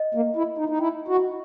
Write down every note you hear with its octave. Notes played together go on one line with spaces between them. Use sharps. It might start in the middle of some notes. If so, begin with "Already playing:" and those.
Already playing: D#5
A#3
E4 D#5
D#4
D#4
E4 G5
F#4
D#5